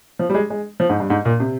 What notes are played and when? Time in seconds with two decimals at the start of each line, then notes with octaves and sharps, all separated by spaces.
0.19 F3
0.30 G3
0.35 G#3
0.50 G#3
0.80 F3
0.90 G#2
1.00 G2
1.10 G#2
1.25 A#2
1.40 C3